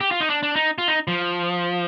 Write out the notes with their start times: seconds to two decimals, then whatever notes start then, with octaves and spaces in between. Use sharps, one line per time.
0.01 G4
0.11 F4
0.20 D#4
0.30 D4
0.43 D4
0.56 D#4
0.78 F4
0.88 D#4
1.08 F3